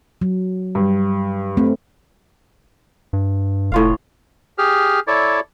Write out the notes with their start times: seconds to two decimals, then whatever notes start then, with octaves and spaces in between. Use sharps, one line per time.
0.21 F#3
0.75 G2
1.57 A3 C4
3.13 G2
3.72 F1 A2 F4 F5
4.58 G4 G#4 F6
5.07 E4 A4 C#5 D5